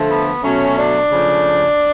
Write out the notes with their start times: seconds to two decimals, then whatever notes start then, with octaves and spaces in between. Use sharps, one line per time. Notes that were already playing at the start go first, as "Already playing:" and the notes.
Already playing: D3 F3 A3
0.10 B3
0.43 B2 F#3 A3 C#4
0.78 D4
1.11 C#3 F3 A3